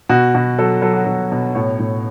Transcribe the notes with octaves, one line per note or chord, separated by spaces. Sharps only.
B2 F#4
B2 F#4
F#3 A4
F#3 A4
F#4
B2 A4
B2
A2 C#5
A2